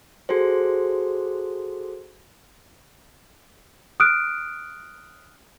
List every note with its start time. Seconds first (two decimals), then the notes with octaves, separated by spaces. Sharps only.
0.29 F#4 G#4 A4 C5
4.00 D#6 F6 F#6 D7